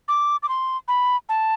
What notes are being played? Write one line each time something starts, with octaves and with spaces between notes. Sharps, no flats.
D6
D6
C6
B5
A5